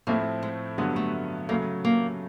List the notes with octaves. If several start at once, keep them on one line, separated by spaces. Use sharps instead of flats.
A2 F3 A3 A#3 C4 E4
G#3
G2 D3 F#3 G#3 B3
A3
C#3 F#3 A3 A#3
A#3